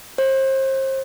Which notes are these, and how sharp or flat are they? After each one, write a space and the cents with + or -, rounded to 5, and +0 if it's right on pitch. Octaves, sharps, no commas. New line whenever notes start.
C5 +35